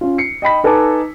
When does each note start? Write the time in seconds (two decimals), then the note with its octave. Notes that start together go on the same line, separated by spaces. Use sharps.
0.01 C#4 F4
0.18 C7 C#7
0.42 D#5 G5 B5 B6
0.64 D#4 A4 B4 G#5 A#5 D6